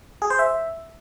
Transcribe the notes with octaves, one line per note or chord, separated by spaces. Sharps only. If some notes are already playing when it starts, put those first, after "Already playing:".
G#4
C5
E5